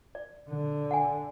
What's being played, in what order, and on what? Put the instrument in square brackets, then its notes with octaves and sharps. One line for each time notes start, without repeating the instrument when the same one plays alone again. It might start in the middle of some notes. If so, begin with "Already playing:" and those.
[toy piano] D5
[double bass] D3
[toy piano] F#5 G#5